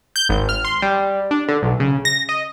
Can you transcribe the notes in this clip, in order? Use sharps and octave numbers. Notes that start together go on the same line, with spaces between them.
G6
G#1
F6
C6
G3
D4
D3
B1
C#3
A#6
D#5